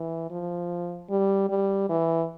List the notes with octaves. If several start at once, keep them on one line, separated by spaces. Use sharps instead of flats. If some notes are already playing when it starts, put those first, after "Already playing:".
Already playing: E3
F3
G3
G3
E3